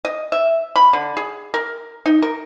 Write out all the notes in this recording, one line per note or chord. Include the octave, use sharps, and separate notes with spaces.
D#5
E5
B5
D3
G#4
A#4
D#4
A#4